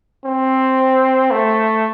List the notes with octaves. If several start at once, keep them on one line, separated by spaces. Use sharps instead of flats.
C4
A3